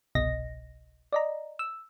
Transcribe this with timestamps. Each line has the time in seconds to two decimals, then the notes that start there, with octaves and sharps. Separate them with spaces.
0.15 G1 C2 B2 D#5 A#6
1.13 D5 D#5 A#5
1.59 E6